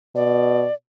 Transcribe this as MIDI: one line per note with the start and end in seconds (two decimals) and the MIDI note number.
0.15 0.65 47
0.15 0.74 74